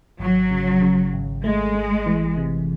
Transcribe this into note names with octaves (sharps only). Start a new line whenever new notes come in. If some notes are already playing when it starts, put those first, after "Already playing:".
G#1 F#3
C#3
C#3
G#1
G#3 A3
A3
E3
C3